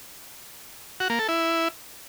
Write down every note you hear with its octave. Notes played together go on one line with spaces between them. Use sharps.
F#4
A#3
A4
E4